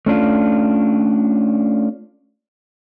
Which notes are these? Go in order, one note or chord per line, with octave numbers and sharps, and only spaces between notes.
A3 C#4 D4 F4